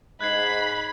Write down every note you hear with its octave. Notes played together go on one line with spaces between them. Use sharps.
G#2 D#5 B5 F#6 G#6 C7